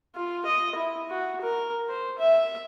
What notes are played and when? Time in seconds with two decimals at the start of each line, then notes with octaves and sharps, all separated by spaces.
0.16 F4
0.46 D#5
0.75 E4
1.10 F#4
1.41 A#4
1.89 C5
2.19 E5